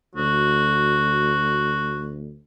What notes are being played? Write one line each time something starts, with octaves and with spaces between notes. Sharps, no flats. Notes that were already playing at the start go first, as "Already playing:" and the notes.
D2 F#4